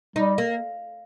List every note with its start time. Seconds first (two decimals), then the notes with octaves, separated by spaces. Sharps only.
0.16 G3 D#4
0.38 A#3